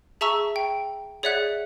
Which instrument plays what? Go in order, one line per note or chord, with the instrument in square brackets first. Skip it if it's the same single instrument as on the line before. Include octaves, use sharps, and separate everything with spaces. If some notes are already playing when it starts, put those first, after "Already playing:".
[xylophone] G#4 E5 A5 A#5 C#6 E6
G5
G#4 C#5 D5 E5 F#5 F#6